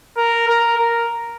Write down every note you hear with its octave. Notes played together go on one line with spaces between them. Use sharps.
A#4
A#4
A#4